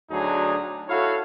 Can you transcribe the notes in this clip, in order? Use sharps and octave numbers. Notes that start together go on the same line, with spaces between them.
D2 F#3 D4 D#4 G#4
E4 F#4 A4 C#5 F5